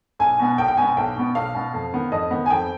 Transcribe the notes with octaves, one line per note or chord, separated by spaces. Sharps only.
B1 G#5
B2 B3
B1 G5
G5
B2 B3 G#5
G#5
B1 G5
B2 B3
B1 F5
B2 B3
F2
D#3 B3
F2 D#5
D#3 B3
G#5
F2 G5